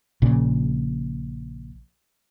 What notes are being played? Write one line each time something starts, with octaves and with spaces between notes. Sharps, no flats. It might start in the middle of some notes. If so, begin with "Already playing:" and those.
A#1 A#2 C#3